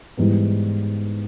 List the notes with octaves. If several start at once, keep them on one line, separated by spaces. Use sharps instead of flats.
G#2 E3 G3 B3